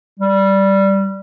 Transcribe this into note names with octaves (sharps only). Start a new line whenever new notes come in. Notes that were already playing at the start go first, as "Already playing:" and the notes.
G3